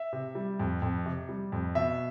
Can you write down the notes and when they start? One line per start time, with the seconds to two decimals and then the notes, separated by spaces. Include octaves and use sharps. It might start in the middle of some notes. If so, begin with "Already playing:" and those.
Already playing: E5
0.13 C3
0.35 G3
0.59 F2
0.82 F2
1.06 C3
1.29 G3
1.52 F2
1.75 B2 E5